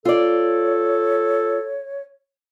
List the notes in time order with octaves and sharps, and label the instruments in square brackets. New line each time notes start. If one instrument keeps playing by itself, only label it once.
[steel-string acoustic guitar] F4 D5 [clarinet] A4 [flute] C#5